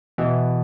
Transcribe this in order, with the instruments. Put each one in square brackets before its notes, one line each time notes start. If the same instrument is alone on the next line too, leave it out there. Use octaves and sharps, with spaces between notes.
[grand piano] B2 [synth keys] E3